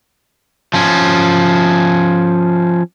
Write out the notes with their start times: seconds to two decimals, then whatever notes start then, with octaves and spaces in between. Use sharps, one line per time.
0.74 F3 C#4